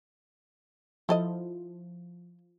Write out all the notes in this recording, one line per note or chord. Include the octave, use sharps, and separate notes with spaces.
F3 E4 A4 D#5